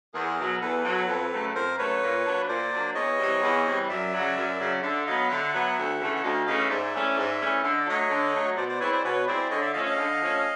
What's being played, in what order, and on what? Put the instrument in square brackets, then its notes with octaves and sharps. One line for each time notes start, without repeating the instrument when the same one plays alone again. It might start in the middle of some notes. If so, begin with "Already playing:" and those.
[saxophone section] E2 [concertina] G#4 A#4
[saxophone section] B2 F#3
[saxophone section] E2 [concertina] A4 B4
[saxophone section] B2 F#3
F2
C#3 F#3 A3
[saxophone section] F2 [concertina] A#4 C5
[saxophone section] C#3 F#3 A3 [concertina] B4 C#5
[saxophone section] A#2
F#3 A#3 D4
[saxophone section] A#2 [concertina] C5 D5
[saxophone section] F#3 A#3 D4
[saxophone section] E2 [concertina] C#5 D#5
[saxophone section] C3 E3 G3
E2
C3 E3 G3
[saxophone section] F#2 [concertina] D5 E5
[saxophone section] C#3 F#3
F#2
C#3 F#3
[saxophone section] D3 [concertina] D5 E5
[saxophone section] F#3 B3 [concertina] D#5 F5
[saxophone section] D3 [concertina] E5 F#5
[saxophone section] F#3 B3
D2
C#3 E3 A3 C#4
[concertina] F#5
[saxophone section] D2 [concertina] D#5 F5
[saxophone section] C#3 E3 A3 C#4 [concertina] D#5 F5
[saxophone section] G#2 [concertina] D5 E5
[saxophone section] E3 A3 C#4
G#2
E3 A3 C#4
[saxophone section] D3 [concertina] E5
[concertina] D#5
D5
[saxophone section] F#3 A3 [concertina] C#5 D#5
[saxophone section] D3
F#3 A3
[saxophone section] B2 [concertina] C5 D5
[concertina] C5 D5
[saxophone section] G#3 C4 E4 [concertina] B4 C#5
[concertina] C5 D5
[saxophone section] B2 [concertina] B4 C#5
[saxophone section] G#3 C4 E4 [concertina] C5 D5
[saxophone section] D3 [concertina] C#5 D#5
[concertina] D5 E5
[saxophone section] F3 A3 C#4 [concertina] D#5 F5
[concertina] D#5 F5
[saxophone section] D3
F3 A3 C#4